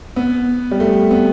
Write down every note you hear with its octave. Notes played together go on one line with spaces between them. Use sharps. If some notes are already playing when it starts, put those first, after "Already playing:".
B3
G3
A3
B3